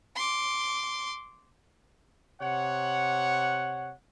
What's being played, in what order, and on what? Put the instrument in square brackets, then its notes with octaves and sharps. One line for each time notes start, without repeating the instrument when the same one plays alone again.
[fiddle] C6 D6
[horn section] C3 C#5 F#5